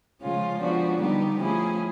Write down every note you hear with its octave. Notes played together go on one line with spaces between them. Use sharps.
C#3 F3 G#3 C#4 F4
F3 G#3 B3 D4 F#4
D3 G3 B3 D#4 G4
F3 A3 C#4 E4 G#4